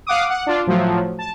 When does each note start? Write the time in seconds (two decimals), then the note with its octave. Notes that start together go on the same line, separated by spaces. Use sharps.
0.07 F5 F#5 D6 D#6
0.30 F#5
0.47 D4 F4
0.67 A2 F3 F#3 A3
1.19 A5